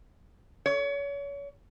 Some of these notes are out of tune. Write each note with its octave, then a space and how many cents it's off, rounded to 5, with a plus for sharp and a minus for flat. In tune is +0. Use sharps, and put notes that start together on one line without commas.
C#5 +35